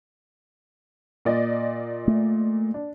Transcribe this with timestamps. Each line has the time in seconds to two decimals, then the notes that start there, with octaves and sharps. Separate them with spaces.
1.25 A#2 D5 D#5
2.08 A3
2.74 D4